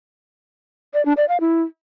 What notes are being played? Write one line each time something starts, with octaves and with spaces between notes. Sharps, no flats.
D5
D4
D5
F5
E4